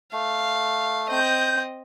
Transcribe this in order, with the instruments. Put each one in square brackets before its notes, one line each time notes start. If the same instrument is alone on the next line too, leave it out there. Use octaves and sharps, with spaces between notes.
[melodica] A3 [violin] F5
[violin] C4 D#5 [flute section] G6